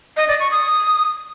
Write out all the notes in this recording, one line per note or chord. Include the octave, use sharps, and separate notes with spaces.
D#5
D5
C#6
D#6